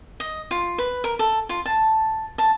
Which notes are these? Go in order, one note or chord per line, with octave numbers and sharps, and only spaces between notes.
D#5
F4
B4
A#4
A4
F4
A5
A5